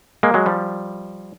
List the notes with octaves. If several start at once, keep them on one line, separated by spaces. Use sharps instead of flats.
G#3 A#3
F#3 G#3
F3 G3